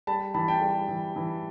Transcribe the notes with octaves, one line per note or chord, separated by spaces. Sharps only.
G3 A5 B5
E3 A5 B5
G5 A5
G3
E3
E3